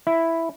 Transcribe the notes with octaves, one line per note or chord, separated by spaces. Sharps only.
E4